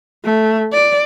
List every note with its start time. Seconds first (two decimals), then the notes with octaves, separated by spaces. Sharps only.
0.25 A3
0.73 D5